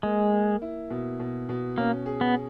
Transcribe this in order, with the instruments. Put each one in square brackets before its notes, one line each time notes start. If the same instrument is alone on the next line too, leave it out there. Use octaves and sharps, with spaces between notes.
[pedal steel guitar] G#3 [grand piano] A#3
[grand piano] A#3
E4
B2
B2
B2
[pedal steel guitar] A#3 [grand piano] C#4
[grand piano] G#4
[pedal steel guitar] B3